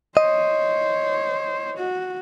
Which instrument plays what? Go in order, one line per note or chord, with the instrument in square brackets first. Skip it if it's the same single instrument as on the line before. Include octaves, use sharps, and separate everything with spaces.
[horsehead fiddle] C5 C#5 [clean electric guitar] D#5
[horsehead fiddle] F#4